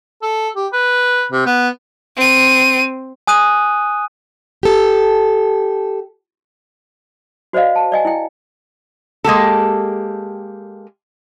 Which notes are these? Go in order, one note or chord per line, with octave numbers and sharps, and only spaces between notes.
A4
G4
B4
C3
B3
C4 D#7
G#5 D#6 F#6 D#7
G4 A4
F#4 C5 D5 D#5 F5
A5
D5 D#5 G#5
E4 G5
G#3 A#3 G4 A4